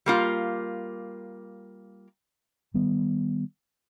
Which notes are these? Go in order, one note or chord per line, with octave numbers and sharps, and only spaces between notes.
G3 A#3 F4
D#3 G3 B3